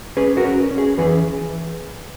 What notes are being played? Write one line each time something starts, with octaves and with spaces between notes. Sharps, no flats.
C#4 G#4 B4
F#4 A#4
C#4
C#4
G#4
E3 G#4 B4